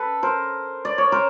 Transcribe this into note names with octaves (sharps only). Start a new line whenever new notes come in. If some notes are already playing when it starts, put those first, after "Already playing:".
Already playing: A4 B4
A#4 C5
D5
C#5
A#4 C5